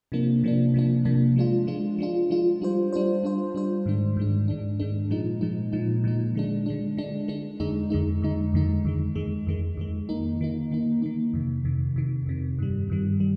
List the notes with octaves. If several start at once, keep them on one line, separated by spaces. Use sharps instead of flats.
C3 F3 A#3 D4
C3 F3 A#3 D4
C3 F3 A#3 D4
C3 F3 A#3 D4
F3 G#3 D4 F4
F3 G#3 D4 F4
F3 G#3 D4 F4
F3 G#3 D4 F4
G3 D4 F4 C5
G3 D4 F4 C5
G3 D4 F4 C5
G3 D4 F4 C5
G#2 D#3 G#3 D4
G#2 D#3 G#3 D4
G#2 D#3 G#3 D4
G#2 D#3 G#3 D4
A#2 F3 G#3 D#4
A#2 F3 G#3 D#4
A#2 F3 G#3 D#4
A#2 F3 G#3 D#4
D3 G#3 D4
D3 G#3 D4
D3 G#3 D4
D3 G#3 D4
F2 D3 G#3 D#4
F2 D3 G#3 D#4
F2 D3 G#3 D#4
F2 D3 G#3 D#4
F2 D#3 G#3
F2 D#3 G#3
F2 D#3 G#3
F2 D#3 G#3
D#3 A#3 D#4
D#3 A#3 D#4
D#3 A#3 D#4
D#3 A#3 D#4
F2 C3 D#3
F2 C3 D#3
F2 C3 D#3
F2 C3 D#3
G2 D#3 G3
G2 D#3 G3
G3